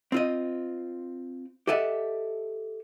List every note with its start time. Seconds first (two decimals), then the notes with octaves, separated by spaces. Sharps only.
0.12 C4 F4 D#5
1.67 G4 A4 D#5 E5 F#5